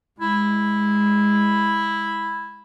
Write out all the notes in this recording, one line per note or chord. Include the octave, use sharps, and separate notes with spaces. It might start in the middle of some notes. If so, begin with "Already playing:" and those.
G#3 E4